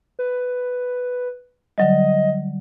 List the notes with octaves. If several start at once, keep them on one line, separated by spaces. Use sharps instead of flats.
B4
D3 F#3 G3 D#5